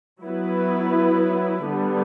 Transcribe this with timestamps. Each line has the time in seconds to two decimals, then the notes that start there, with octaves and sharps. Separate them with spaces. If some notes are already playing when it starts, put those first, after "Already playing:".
0.22 F#3 B3 E4 B4
1.66 D3 G3 B3